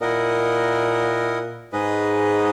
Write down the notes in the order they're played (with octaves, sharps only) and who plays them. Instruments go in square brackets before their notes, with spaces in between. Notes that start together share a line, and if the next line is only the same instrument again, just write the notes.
[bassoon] A#2 [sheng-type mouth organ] E4 A#4 D#5 F#5
[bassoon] G#2 [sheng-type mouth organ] G#4 B4 D#5